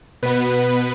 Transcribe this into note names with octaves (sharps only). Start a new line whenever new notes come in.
B2 B3 B4